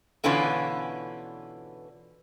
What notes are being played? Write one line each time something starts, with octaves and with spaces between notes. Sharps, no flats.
B2 D3 E3 C#4 F4 B4